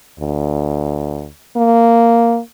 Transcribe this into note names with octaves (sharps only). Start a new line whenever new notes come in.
D2
A#3